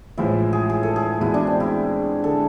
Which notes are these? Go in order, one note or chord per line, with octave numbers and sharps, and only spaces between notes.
A1 A2 F3 G#3 E4
G#4
G#4
A4
G#4
E2 B2 G#3 E4
D4
C4
E4
D3 G#3 A4